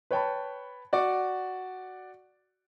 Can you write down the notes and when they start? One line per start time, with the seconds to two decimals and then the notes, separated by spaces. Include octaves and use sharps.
0.11 B4 C#5 G5 A5 B5
0.93 F#4 D5 C#6 D6